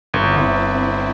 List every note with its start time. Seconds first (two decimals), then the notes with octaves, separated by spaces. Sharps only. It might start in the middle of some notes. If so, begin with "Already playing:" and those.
0.14 G1 C4 E4
0.37 G1